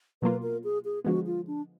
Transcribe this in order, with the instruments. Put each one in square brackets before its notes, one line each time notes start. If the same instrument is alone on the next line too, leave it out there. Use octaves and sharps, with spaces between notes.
[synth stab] B2 F#3 A#3 F4 [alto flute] B4
[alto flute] A#4
G#4
G#4
[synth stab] D3 F3 G#3 B3 [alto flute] F#4
[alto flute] F4
D4